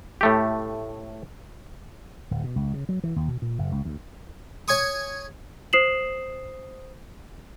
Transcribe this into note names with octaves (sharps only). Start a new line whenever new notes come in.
A2 A3 G4
D1
B2
C#2
C#3
F#3
E3
D#2
B2
A#2
F#1
C#2
D2
C#5 G#5 C#6 D#6
C5 D#6 C7 E7 F#7